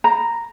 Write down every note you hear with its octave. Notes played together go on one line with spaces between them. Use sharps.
A#5